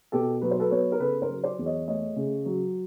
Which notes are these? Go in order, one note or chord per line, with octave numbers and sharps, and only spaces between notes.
B2 G4 A4
F#3 B4
C5
A4 B4
B3 B4 C#5
A#4
C#3 A4 B4
A#4 C5
F#3
C5 D5
E2
C#5 D#5
A3 C#5 D#5
C#3
F#3